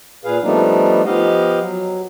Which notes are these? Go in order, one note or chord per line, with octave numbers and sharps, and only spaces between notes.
A#2 G#4 B4 F5
F3 G3 A3 B3 D4 D#4
F3 B3 G4 D#5 F5
F#3